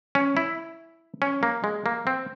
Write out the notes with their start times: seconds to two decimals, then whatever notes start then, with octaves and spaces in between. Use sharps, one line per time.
0.15 C#4
0.37 E4
1.22 C#4
1.43 A#3
1.64 G#3
1.86 A#3
2.07 C4